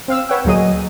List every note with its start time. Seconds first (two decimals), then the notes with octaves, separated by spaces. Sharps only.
0.08 C4 F5 E6
0.29 B4 C#5 F#5 G5 E6
0.45 D2 A#2 F#3 G#4 D#5 D#7